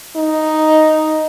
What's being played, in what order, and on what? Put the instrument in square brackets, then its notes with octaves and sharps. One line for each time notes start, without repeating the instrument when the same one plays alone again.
[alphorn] D#4